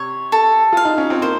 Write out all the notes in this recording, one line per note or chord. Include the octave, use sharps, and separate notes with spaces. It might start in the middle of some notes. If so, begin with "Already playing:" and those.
Already playing: C3 C#5
A4
F4 F5
D#4
C#4
C4
A#3 C5